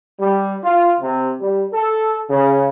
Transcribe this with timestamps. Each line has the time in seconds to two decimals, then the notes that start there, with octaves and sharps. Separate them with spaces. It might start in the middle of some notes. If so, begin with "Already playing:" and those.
0.20 G3
0.64 F4
1.01 C3
1.40 G3
1.73 A4
2.30 C#3